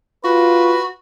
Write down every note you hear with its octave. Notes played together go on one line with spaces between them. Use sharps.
F4 F#4 B4